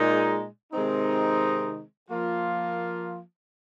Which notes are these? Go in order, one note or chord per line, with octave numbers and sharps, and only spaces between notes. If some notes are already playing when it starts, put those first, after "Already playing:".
Already playing: A#2 G#3 D#4
C3 D#3 G#3 C4 D#4
F3 A#3 F4